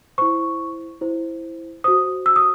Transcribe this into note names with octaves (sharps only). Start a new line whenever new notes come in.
E4 C5 C#6
E4 C5
F#4 C5 D#6
E6
D#6